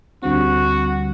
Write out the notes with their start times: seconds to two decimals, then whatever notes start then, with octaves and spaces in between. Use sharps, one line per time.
0.23 D2 D3 G3 C4 F#4